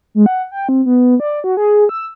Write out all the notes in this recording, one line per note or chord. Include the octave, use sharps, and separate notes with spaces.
G#3
F#5
G5
C4
B3
D5
F#4
G#4
E6